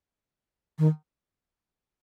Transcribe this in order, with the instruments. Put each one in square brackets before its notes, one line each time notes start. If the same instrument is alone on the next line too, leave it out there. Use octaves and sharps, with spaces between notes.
[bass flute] D#3